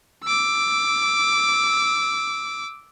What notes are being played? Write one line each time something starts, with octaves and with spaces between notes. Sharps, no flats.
D6 E6